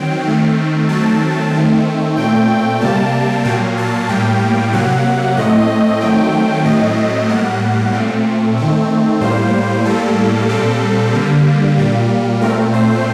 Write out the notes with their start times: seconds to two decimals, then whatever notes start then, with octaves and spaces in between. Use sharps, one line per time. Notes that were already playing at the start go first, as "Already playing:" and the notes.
Already playing: D#3 F#3 C4 G5
0.26 D#3 A3 C4
0.89 D#3 F#3 A3 C4 A5
1.54 D#3 A3 C4
2.17 A#2 A3 C4 G5
2.81 C3 G3 A#3 A5
3.45 A#2 F#3 A#3 G5
3.78 A5
4.09 A2 G3 A#3 G5
4.73 C3 F#3 A#3 F#5
5.36 A2 A3 C4 D#5
6.01 D#3 F#3 A3 C4 G5
6.65 A2 F#3 A3 C4 D#5
7.28 A2 G3 A#3 F#5
7.93 A#2 A3 C4
8.57 D#3 A3 C4
9.21 A2 G3 A#3 C5
9.85 A2 G3 A#3 A4
10.49 A#2 G3 C4 A4
11.14 D3 G3 A#3
11.78 A#2 G3 A#3
12.41 A#2 A3 C4 A#4
12.74 C5